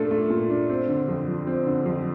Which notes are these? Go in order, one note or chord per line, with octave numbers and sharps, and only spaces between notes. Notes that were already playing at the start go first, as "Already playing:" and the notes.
Already playing: A#2 A3 D4 A4
A3
A#2
D4
C4
D3
F2
F3
C4
D3
F2